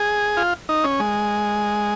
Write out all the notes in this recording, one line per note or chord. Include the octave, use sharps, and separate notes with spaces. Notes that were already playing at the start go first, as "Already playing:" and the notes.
Already playing: G#4
F4
D#4
C#4
G#3